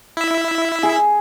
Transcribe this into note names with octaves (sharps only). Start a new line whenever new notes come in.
E4 E5
G#4